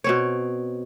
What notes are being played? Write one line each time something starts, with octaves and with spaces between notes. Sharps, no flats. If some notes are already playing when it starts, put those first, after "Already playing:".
B2 C4 C#5